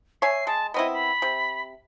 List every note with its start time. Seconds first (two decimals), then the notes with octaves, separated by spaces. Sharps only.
0.22 C#5 E5 G#5 C7
0.47 G#3 A5
0.74 B3 C4 E4 D#5
0.93 B5
1.22 C3